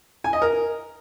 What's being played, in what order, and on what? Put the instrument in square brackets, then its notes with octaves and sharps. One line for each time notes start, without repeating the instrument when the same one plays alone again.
[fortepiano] G#5
D#5
A#4